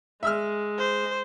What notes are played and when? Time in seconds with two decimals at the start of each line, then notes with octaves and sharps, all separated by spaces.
0.23 G#3 E5 E6 F6
0.79 C5